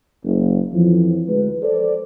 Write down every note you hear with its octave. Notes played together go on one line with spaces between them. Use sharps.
F#1
F2 E3 F3
D2 G#3 B4
A4 C5 D5